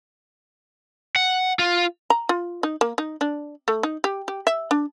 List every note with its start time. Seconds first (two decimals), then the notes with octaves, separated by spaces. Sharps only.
1.16 F#5
1.59 F4
2.10 A#5
2.29 F4
2.63 D#4
2.81 A#3
2.98 D#4
3.21 D4
3.68 A3
3.83 D#4
4.04 G4
4.28 G4
4.47 E5
4.71 D4